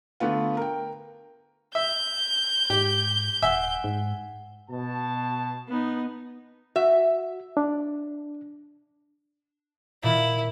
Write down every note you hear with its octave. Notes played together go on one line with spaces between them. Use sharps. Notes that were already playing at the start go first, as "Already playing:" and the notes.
D3 A3 B3 F4
A#4 G5
E5 G6
G#2 G4
D#1 E5 F#5 G#5
G#2
B2 A5
B3 D#4
F#4 E5
D4
A#2 D#3 E4 A#4